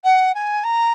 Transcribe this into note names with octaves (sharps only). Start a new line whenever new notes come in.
F#5
G#5
A#5